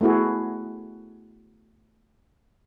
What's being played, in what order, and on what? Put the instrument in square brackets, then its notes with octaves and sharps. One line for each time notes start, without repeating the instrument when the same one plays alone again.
[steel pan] A3 B3 E4 F#4 G#4